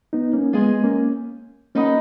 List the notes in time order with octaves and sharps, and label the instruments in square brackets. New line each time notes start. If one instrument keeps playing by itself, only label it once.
[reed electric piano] B3 D#4
A#3 C#4
[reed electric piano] G#3 B3 [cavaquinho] F4 G#4 D#5 G#5
[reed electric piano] A#3 C#4
[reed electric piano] A#3 C#4 [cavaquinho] D#4 F#4 B4 D#5